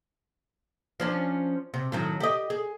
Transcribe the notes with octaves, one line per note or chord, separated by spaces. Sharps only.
F3 C#4 D4
C3
A2 D#3 F#3
G4 D#5
G#4